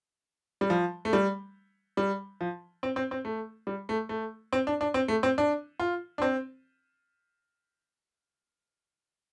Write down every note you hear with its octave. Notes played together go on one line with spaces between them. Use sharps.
G3
F3
A3
G3
G3
F3
C4
C4
C4
A3
G3
A3
A3
C4
D4
D4
C4
A3
C4
D4
F4
D4
C4